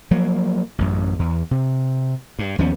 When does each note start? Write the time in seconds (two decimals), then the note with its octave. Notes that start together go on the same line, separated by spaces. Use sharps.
0.11 F3 F#3 A#3
0.78 A1 F#2
1.19 E2
1.51 C3
2.39 G2
2.58 D#2 F3 B3 C#4